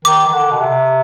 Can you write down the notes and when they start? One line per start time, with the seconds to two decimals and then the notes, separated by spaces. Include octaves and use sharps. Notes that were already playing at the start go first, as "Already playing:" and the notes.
0.05 D#3 D6
0.27 D#3
0.33 D3
0.51 B2
0.61 C3